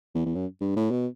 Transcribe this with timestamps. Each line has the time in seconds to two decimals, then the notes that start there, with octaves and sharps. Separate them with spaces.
0.15 E2
0.26 E2
0.35 F#2
0.61 G2
0.76 A2
0.91 B2